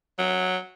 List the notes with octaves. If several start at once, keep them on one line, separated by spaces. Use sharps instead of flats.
F#3